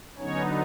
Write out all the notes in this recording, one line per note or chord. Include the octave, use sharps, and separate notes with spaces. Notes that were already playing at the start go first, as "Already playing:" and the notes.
D3 F#3 B3 C#4 D#4 C#5